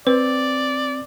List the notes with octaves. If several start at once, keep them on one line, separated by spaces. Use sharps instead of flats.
C4 B4 D5